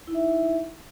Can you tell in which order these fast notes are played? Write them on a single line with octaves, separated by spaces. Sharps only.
E4 D#4 E5